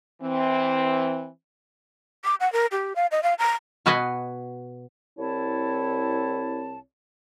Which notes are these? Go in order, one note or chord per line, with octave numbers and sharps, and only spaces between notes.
E3 C4
D6
F#5
A#4
G4
F5
D#5
F5
A#5
B2 F#4 B4 D#5 G#5
C2 C4 E4 C#5 A5